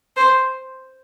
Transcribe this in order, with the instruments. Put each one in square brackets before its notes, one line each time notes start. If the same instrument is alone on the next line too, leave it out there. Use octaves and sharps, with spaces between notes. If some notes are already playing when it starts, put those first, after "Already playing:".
[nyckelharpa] C5